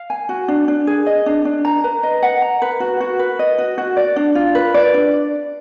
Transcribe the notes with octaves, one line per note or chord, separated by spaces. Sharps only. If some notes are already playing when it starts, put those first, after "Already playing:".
Already playing: F5
G#5
F#4
D4
D4
G#4
D#5
D4
D4
A#5
B4
D#5
F#5
A#5
B4
F#4
F#4
B4
D#5
F#4
F#4
D5
D4
F4
B4
D5
D4